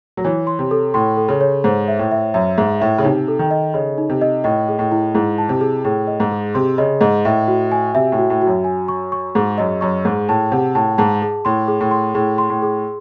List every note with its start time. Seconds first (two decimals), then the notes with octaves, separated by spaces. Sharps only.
0.17 F#3
0.24 E3 C#5
0.47 C6
0.59 C3
0.71 A4
0.94 A2 C6
1.17 A4
1.28 C#3
1.41 C#5
1.64 G#2 C5
1.88 E5
1.99 A2
2.11 E5
2.34 F#2 E5
2.58 G#2 E5
2.80 A2 E5
2.98 C#3
3.04 C3 D#4
3.28 A4
3.39 D#3
3.51 D#5
3.74 C#3 D#5
3.98 D#4
4.10 C3
4.21 D#5
4.44 A2 D#5
4.68 G#4
4.79 A2
4.92 E4
5.15 G#2 E4
5.38 A5
5.49 C3
5.61 G#4
5.84 A2 G#4
6.07 D#5
6.20 G#2
6.32 G#4
6.54 C3 C6
6.78 C#3 D#5
7.01 G#2 D#5
7.25 A2 E5
7.48 F#4
7.72 G#5
7.94 C3 E5
8.12 A2
8.18 F#4
8.30 A2
8.42 F#4
8.47 F#2
8.64 G#5
8.88 C#6
9.12 C#6
9.35 G#2 G#4
9.58 F#2 D#5
9.81 F#2 C#6
10.04 G#2 G#4
10.29 A2 A5
10.52 C3 F#5
10.75 A2 A5
10.98 G#2 A5
11.22 G#4
11.45 A2 C6
11.68 G#4
11.80 A2
11.91 C6
12.15 A2 G#4
12.38 C6
12.50 A2
12.62 G#4